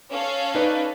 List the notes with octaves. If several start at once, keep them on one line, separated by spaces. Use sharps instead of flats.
C#4 A4 F5
D#4 B4 D5